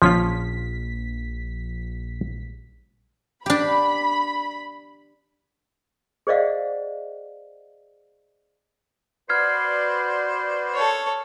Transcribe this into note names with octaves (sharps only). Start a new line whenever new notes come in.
A#1 F3 C#4 F4 B6
D4 G4 B5
G#4 C5 D5 D#5 F5 F#5
F#4 B4 C5 D5 F6 G#6 C7
A4 C#5